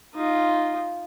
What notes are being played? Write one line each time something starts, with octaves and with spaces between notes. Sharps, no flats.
D#4 F4